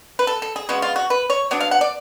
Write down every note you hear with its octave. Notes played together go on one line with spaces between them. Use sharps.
B4
A4
A4
G#4
C#3 G#3 B3 F#4
F4
F#4
B4
C#5
F#3 B3 D4 D5
F5
F#5
D5